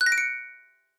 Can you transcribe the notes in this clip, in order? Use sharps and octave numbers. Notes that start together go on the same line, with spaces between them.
F#6
A#6
D7
C#7